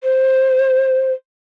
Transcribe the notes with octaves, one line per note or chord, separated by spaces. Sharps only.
C5